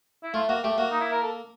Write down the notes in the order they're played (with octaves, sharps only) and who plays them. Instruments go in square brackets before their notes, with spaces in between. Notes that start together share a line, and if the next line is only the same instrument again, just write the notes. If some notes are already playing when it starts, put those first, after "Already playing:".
[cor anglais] E4
[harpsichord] A3 [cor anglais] F4
[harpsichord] A#3 [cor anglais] F#4
[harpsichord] A3 [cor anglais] G4
[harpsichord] A#3 [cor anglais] F#4
[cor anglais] D#4
E4
A#4
A4